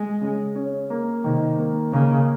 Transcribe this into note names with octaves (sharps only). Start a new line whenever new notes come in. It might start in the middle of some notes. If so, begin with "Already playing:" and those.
Already playing: G#3
C#3
C#4
A#3
C3 D#3
A#3
C#3 A#3